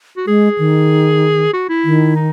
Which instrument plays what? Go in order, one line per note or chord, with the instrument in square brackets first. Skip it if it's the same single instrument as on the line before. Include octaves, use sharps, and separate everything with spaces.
[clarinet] F#4
[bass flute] G#3 [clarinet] G#4
[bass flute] D#3
[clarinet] F#4
E4
[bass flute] D#3
[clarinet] D#4